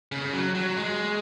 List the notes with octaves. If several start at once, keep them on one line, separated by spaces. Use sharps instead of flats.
C#3
F#3
F#3
G#3